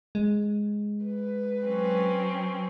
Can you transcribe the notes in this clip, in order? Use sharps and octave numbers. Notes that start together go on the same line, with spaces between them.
G#3
B4
F#3 C4 C#4